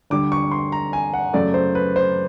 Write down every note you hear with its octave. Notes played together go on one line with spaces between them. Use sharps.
D2 D3 G3 D6
C#6
C6
A#5
G#5
F#5
F#2 C#3 F#3 A3 D5
C5
B4
C5